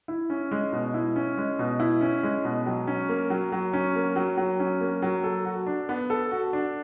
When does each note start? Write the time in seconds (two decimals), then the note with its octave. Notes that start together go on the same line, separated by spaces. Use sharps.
0.08 E4
0.30 C#4
0.51 G#3
0.73 B2
0.94 E4
1.16 C#4
1.38 G#3
1.59 B2
1.80 E4
2.01 C#4
2.23 G#3
2.45 B2
2.66 F#3
2.87 C#4
3.09 A#3
3.30 F#3
3.52 F#3
3.73 C#4
3.96 A#3
4.16 F#3
4.37 F#3
4.60 C#4
4.81 A#3
5.02 F#3
5.24 A4
5.45 F#4
5.67 D4
5.89 B3
6.10 A4
6.31 F#4
6.53 D4